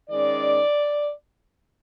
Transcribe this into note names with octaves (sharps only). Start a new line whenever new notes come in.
D#3 G#3 C#4 D5